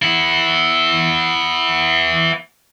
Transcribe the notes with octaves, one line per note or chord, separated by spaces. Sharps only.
B3 E4